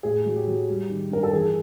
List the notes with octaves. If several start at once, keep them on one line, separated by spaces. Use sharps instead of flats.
A2 G#4
F#3
G4
F#3
G3
D#3
G2 A#4
A4
E3 G#4